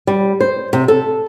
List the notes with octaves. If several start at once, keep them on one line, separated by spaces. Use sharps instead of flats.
G3
C5
C3
A4